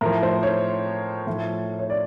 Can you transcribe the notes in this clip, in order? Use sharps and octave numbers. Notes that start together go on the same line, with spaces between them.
A2 F3 A#4
C5
C#5
A2 F3
C#5
D5